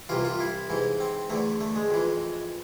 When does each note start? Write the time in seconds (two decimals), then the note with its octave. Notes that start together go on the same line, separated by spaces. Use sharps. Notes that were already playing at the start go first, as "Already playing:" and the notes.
0.09 C2 C3 E3 F4
0.25 F4
0.40 E4
0.70 G#2 E3
1.00 C4
1.30 E2 D3 A3
1.61 A3
1.76 G#3
1.91 F2 E3